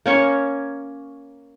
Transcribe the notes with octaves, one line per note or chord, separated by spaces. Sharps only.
A#3 C#4 C#5 C#6